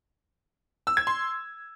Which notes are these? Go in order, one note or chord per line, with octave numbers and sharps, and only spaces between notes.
E6
G#6
C6